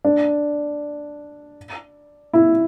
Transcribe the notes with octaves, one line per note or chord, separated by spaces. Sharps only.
D4
E4